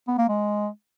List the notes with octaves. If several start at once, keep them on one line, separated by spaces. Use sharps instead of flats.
B3
A#3
G#3